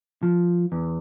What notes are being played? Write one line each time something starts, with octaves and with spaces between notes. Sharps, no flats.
F3
E2